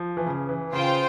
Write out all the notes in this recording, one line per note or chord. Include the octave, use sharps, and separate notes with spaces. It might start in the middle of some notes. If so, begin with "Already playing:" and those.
Already playing: F3
E3
C#3
E3
C#3 F4 C5 G5